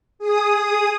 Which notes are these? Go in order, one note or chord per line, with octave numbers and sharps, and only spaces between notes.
G#4 D#6